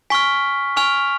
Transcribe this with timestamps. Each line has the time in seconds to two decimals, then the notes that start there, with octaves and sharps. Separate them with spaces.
0.10 G#5 C#6 F6 B6
0.76 G#5 C#6 F6 F7